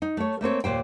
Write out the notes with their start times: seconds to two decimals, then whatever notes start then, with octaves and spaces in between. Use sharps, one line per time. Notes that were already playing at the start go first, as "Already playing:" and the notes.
0.02 D#4
0.17 A3 C#5
0.41 A3 A#3 C4 C#5
0.64 D#2 A#2 C5 G5